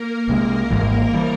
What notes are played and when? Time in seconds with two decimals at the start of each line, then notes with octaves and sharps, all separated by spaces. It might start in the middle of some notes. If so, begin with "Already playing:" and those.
Already playing: A#3 A#4
0.28 C2 C3 E3 G#3 A#3 A#4
0.71 G#1 G#2 E3 G3
1.13 E3 G3